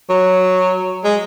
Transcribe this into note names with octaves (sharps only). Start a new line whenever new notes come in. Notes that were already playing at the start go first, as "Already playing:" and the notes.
F#3
G#3